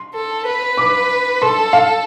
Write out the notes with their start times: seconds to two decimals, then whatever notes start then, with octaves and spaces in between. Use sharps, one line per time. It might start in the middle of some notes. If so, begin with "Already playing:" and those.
Already playing: C6
0.14 A4
0.46 B4
0.77 D6
1.42 A4 C6
1.73 F5